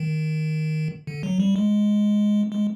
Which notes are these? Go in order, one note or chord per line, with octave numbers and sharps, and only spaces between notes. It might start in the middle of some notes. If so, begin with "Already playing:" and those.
Already playing: D#3
D3
F#3
G3
G#3
G#3